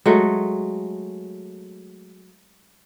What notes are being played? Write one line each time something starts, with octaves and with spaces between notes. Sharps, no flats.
F#3 G#3 A3